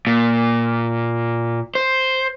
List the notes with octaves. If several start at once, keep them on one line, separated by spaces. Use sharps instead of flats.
A#2
C5